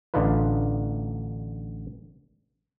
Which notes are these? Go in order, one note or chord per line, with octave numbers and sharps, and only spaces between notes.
A1 D3 D4 D#4 F4 B4